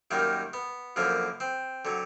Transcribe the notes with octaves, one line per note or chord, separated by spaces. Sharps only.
F#2 D#3 G3 A#3
B3
F#2 D3 F3 A#3
C4
D3 F#3